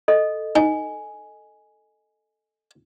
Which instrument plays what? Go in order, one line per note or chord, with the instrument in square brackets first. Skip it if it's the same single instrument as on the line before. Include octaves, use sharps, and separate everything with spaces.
[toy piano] A4 D#5
[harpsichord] D#4 [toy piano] G#5